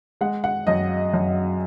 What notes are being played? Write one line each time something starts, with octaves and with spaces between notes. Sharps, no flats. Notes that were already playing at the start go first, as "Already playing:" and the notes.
G#3 F#5
F#5
F#2 D#5
F#2